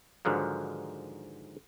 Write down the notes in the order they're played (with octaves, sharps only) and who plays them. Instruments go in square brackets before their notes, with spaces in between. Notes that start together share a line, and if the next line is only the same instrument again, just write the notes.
[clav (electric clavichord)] G#2 D3 D#3 F3 F#3